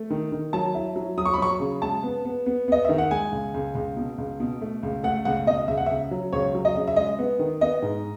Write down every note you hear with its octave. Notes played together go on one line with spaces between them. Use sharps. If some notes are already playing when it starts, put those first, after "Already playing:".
Already playing: A3
D#3
D#3
F#3 A5
E4
F#3
F#3 D#6
C#6
B5
F#3 C#6
C#3
G#3 A5
B3
B3
B3
B3 D#5
D#3 E5
F#5
G#3 G#5
C#2
C#2
C#2
B2
C#2
B2
A3
C#2
A3 F#5
C#2 F#5
B2 D#5
C#2 E5
F#5
C#3 E5
F#3
C#2 C#5
F#3
D#5
C#3
E5
G#3 D#5
B3
D#3
B3 D#5
G#2